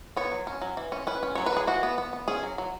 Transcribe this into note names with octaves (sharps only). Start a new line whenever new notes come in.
B3 C#5
F#3
C#4
F#3
E3
C#4
C#4 B4
C#4
F#3 C#5
B4
F#3 G#4
E3 F#4
B3
B3
B3
C#4 G#4
F#3
F#3